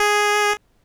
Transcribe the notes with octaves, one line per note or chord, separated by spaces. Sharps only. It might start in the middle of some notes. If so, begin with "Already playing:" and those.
Already playing: G#4